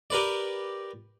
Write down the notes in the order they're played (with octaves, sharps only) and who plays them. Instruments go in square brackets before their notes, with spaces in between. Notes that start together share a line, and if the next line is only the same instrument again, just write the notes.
[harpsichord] G4 A#4 B4 D5